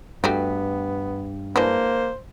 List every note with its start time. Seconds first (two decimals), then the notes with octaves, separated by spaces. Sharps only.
0.24 G2 A3 B3 F#4 G4
1.56 E3 G#3 A#3 D4 C5